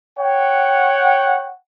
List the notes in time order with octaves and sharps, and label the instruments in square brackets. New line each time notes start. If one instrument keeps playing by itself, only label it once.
[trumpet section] C#5 F#5 G5